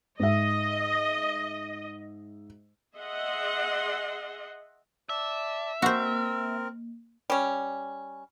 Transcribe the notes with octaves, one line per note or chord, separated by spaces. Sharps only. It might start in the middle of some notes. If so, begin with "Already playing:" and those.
G#2 D#5 E5
G#4 D#5 E5 F#5 C6
D5 E5 A5
A#3 C4 F#4 A#4 C5
G3 C#4